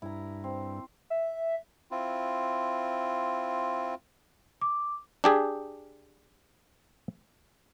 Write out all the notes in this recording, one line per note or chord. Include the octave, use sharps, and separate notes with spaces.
G2 E4 A#5
C4
E5
C4 E4 F4
D6
D4 G4 G#4